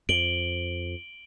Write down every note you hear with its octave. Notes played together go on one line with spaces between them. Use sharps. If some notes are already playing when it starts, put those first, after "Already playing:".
F2 D7 F#7 G7